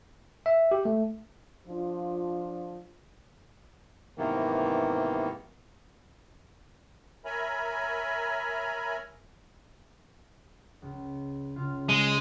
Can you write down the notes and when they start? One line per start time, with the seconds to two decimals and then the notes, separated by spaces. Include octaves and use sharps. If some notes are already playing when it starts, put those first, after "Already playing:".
0.46 E5
0.71 G4
0.85 A3
1.68 F3 D4 F4
4.18 G#2 C3 D#3 E3 A#3 B3
7.25 A#4 C#5 E5 G#5 A#5 B5
10.82 C#2
11.56 C#2 C#3 F4
11.89 G#3